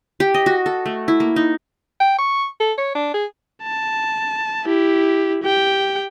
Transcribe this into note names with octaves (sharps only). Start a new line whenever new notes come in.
G4
D#5
F#4
A4
A3
E4
A#3
D#4
G5
C#6
A4
C#5
D4
G#4
A5
E4 G4
G4 G5